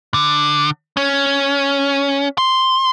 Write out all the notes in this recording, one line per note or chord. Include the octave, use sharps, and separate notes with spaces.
D3
C#4
C6